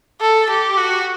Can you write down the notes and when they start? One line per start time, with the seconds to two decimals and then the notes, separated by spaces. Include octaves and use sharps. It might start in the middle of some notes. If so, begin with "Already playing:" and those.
0.21 A4
0.50 G4
0.77 F#4